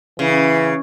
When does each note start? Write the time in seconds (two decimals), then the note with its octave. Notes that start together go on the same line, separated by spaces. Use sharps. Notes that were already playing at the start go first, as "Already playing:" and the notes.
0.19 C#3 E3